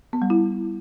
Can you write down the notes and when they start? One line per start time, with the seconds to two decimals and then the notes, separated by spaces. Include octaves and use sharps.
0.13 B3
0.22 G3
0.30 E4